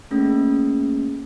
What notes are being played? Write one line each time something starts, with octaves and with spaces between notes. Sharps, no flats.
A3 A#3 C#4 G#4